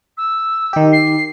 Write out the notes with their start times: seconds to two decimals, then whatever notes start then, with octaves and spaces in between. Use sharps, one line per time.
0.17 E6
0.73 D#3 G4
0.92 C7